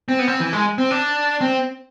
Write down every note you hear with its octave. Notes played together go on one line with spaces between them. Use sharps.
C4
B3
C4
E3
G#3
C4
D4
C4